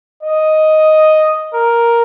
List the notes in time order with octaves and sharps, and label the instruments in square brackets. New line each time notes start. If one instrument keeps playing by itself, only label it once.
[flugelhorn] D#5
A#4